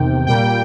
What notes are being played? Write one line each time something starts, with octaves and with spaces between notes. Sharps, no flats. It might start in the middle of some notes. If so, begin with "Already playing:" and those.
Already playing: E2 C3 D#3 G5
A#2 G3 A#3 G5